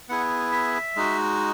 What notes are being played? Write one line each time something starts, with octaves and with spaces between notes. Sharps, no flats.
B3 E4 G#4 F#5
E5
G#3 D#4 F#4